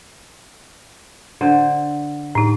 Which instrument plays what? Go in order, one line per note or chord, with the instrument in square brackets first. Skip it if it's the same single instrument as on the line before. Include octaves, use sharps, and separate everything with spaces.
[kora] D3 C5
[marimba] A2 D#4